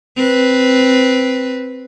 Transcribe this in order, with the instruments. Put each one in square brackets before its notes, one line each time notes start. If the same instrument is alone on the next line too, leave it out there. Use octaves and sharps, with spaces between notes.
[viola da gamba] C4 B4